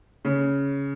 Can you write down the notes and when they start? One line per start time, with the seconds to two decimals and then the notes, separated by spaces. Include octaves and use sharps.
0.25 C#3